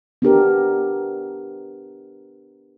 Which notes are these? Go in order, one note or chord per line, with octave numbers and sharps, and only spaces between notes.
B3 D4 G4 A#4